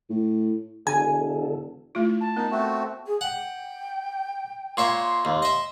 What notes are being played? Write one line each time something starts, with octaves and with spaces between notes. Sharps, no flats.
A2
E1 D3 G#5
A3 E4 F4
A5
B3 D#4 A#4
A3 C4 F#4
G#4
F#5 G5
A#2 C#5 E5 C6
D#2
D#5 E5